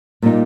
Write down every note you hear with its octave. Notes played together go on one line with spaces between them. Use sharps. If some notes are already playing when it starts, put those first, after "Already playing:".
A#2 G3 A#3 D#4